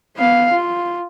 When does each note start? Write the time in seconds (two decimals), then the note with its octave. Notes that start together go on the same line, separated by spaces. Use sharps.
0.17 B3 F5
0.53 F4